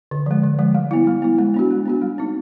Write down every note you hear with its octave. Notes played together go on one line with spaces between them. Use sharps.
D3
F3 G#3
D3
F3 G#3
G3
B3 E4
G3
B3 E4
G#3
B3 D4 F#4
G#3
B3 D4 F#4
G3
C4 D#4